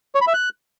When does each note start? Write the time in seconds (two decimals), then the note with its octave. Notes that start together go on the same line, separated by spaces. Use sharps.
0.15 C#5
0.21 B5
0.27 E5
0.34 F#6